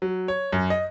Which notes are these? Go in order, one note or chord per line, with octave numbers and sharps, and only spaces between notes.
F#3
C#5
F#2
D#5